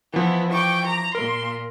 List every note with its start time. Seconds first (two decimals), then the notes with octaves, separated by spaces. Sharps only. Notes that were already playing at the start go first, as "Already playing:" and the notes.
0.13 E3 F3 B3 E4
0.51 G5 C#6 D6
0.86 A#5
1.15 A#2 A#4 C6